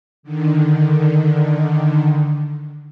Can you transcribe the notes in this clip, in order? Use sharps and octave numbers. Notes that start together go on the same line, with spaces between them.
D3 D#3